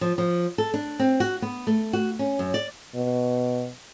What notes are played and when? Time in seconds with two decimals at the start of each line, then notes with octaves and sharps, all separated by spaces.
0.01 F3
0.18 F3
0.58 A4
0.74 D4
0.99 C4
1.20 F#4
1.42 B3
1.67 A3
1.93 F#4
2.19 C#4
2.39 F#2
2.54 D5
2.95 B2